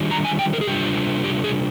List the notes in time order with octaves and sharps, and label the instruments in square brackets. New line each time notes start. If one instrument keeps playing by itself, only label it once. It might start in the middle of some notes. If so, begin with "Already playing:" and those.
Already playing: [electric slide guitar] D#3 G3 D4 F4
A#5
G#5
G5
A#4
G#4
C3 G3 D4 F4 G4
G4
G#4